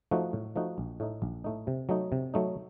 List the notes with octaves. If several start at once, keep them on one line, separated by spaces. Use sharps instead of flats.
F3 A3 D#4 F#4
A2
F3 A3 D#4 F#4
A#1
A2 A3 D#4
A#1
A2 A3 D#4
C3
F#3 A3 D#4
C3
F#3 A3 D#4